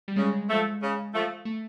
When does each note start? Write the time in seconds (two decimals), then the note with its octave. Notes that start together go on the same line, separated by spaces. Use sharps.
0.08 G3
0.16 C#3 G#3
0.49 F3 A3
0.82 C#3
1.14 F3 A3
1.45 A3